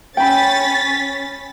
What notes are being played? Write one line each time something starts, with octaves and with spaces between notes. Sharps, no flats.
C#4 G5 B5 A6 B6